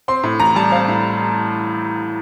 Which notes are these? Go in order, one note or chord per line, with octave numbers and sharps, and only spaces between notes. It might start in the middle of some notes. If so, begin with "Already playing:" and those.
C4 C6
A2
A1 A#5
G3 A5
C4 F5
A2